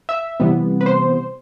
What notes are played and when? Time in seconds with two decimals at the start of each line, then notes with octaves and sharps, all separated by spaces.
0.09 E5
0.40 C3 E3 G3 B3
0.81 B4
0.86 C5